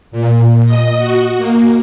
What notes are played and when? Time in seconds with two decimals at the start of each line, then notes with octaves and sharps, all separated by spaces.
0.12 A#2
0.66 D#5
0.99 F#4
1.38 A#3